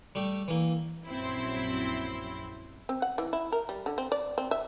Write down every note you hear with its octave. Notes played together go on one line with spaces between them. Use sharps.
G3 A3 G4
E3 A#3
A#1 F#2 F#3 C4 E4 C6
C4
F#5
E3
E4
A#4
G3
D3
C4
D5
C4
E5